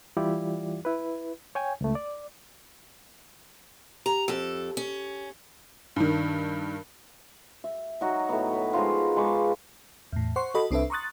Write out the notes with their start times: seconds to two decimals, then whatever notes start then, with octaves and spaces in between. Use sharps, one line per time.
0.17 E3 G3 E4 F4 G4 D5
0.85 E4 B4
1.55 C#5 G5 G#5
1.81 C#2 A3
1.95 D5
4.06 G4 A#5
4.28 F2 A4
4.77 C#4
5.96 G2 D#3
7.64 E5
8.01 F#3 D#4 F#4
8.29 A2 B3
8.53 B4
8.73 F3 G#3 D#4 F4
9.16 G#3 B4 C#6 D6
10.12 E2 A2
10.36 C5 F#5 C6 C#6
10.54 F#4 A4 D#5 B5
10.71 C2 C4 D4 A4 B4 E5
10.90 A#5 C6 C#6 D#6 F#6 A6